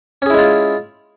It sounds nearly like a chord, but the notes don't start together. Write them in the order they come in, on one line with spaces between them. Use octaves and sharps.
C#4 G#4 E4 G#3 F4